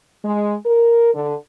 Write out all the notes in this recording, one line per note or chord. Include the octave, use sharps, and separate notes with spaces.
G#3
A#4
D3